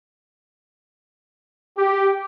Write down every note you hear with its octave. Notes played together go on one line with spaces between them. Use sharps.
G4